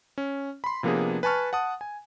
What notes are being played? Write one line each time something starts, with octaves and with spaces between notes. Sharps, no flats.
C#4
B5 C6
C3 F3 A#3 B3 D4 G#4
B4 G#5 A5 C#6 F6
F#5 A5 D#6
G#5